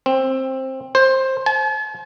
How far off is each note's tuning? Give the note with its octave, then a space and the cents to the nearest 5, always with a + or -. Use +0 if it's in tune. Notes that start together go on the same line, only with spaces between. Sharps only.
C4 +15
C5 +15
A5 -45